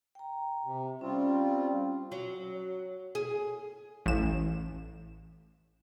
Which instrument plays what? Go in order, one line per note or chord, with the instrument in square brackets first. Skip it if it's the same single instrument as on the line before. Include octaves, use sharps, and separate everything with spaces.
[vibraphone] G5 A#5
[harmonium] C3
[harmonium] G3 C4 F4 [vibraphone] C#4
[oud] F#3
G#4
[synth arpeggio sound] A1 E7